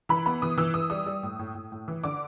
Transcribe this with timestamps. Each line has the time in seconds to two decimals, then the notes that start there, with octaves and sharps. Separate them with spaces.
0.09 E3 B5
0.26 B3 B5
0.42 E3 D#6
0.58 E3 E6
0.74 E3 D#6
0.90 G3 D#6
1.06 G3
1.23 A2
1.39 A2
1.54 A2
1.72 A2
1.88 E3
2.04 D3 D6